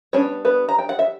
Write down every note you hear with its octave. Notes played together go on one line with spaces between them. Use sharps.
G3 B3 C#4 D4 C#5
B3 B4
A#5
G5
F#5
E5